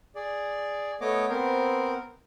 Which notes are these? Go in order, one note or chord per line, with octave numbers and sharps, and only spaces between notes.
G#4 D5
A3 B3 C#5 D#5 D6
B3 C4 A#4 C5